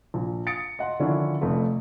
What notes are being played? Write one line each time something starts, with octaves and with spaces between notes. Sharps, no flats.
A#1
D#6 A6 C#7 D7
D#5 F#5 C6
D3 D#3 F3 C#4 D4 E4
F1 F2 A3